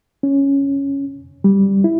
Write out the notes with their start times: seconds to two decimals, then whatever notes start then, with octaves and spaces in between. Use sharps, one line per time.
0.23 C#4
1.44 G3
1.84 E4